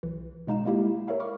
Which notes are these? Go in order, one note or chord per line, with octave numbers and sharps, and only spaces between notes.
B1 E3
B2 G#3 D#4 F5 E7
G#3 A#3 E4 G4 F5
A#4 C#5 E5 F5 B5
B5 C#6 D6 F6